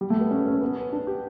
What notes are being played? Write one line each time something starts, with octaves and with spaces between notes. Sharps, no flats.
G3
A3
B3
C#4
C#4
B3
D4
G4